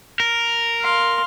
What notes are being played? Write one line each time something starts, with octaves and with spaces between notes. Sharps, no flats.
A#4
F5 C6